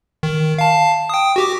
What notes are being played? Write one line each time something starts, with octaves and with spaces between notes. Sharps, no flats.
D#3
F5 A5
G5 D#6
F#4 G4 D6